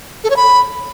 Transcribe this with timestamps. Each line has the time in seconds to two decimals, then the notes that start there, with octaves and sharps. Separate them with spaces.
0.24 A4
0.30 C#5
0.36 B5